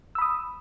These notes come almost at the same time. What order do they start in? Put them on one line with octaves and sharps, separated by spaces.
E6 B5 D#6